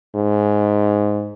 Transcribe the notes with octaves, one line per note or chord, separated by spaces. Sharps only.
G#2